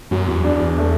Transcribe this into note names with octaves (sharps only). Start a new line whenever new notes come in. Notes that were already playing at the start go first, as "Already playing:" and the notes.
F#2 F#3
E2
D4
A3